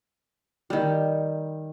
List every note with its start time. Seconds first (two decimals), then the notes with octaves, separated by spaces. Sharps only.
0.70 D#3 G3